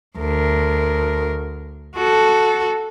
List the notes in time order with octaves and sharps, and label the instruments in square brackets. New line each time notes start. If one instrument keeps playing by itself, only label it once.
[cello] D2 A#4
F#4 A4